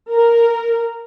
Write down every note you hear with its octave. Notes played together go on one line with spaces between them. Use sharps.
A#4